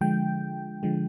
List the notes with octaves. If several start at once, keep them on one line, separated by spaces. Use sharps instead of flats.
D3 F3 G#3 G5
D3 F3 G#3